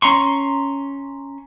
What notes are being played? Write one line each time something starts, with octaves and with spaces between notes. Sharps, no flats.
C#4 A#5 C6 C#6